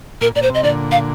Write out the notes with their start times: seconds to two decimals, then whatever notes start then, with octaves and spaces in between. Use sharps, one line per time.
0.21 A#2 A#4
0.35 A#2 D5
0.42 C5
0.50 C3 D#5
0.63 A#2 D3 D5
0.92 F5